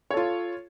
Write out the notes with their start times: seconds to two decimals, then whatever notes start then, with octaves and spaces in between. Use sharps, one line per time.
0.11 C#5
0.14 A4
0.17 F4